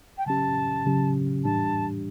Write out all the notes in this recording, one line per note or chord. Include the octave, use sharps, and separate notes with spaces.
G5
C#3 F#3 C#4 G4 A5
C#3 F#3 C#4 G4
A2 E3 G3 D4 G4 A5